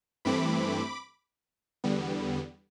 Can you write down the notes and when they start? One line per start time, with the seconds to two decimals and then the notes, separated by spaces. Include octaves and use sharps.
0.25 G2 E3 A3 C4 B5 D6
1.84 E2 D3 G3 B3